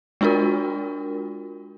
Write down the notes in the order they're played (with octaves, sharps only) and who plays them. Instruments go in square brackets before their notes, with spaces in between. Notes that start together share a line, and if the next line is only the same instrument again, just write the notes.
[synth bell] G#3 D4 F4 F#4 A#4